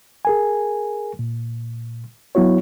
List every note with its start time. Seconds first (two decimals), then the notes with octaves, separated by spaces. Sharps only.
0.25 G#4 A#4 G#5
1.19 A#2
2.35 F#3 B3 E4 F#4 C#5